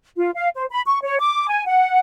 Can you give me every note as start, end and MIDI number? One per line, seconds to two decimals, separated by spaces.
0.17 0.31 65
0.35 0.49 77
0.55 0.65 72
0.71 0.81 83
0.86 0.98 85
1.03 1.18 73
1.19 1.48 86
1.48 1.66 80
1.67 1.99 78